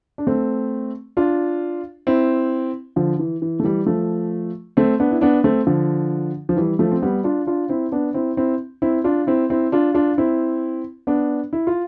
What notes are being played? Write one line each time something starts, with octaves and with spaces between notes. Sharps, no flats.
D4
A3 C4
D4 F4
C4 E4
D3 F3
E3
E3
A3
E3 G3
F3 A3
A3 C4
B3 D4
E4
B3 D4
A3 C4
D3 F3
F3
E3 G3
F3 A3
C4
G3 B3
D4 F4
D4 F4
C4 E4
B3 D4
C4 E4
C4 E4
C4 E4
D4 F4
C4 E4
C4 E4
D4 F4
D4 F4
C4 E4
B3 D4
E4
F4